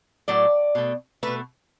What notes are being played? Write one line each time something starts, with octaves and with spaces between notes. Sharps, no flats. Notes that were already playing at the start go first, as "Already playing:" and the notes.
A2 F#3 A3 D5
B2 A3
B2 A3 B4